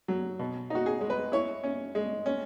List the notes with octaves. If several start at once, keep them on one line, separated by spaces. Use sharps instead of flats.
F#3
B2
D#4 F#4
G#4
G#3
B4
E4 C#5
C#4
G#3
C#4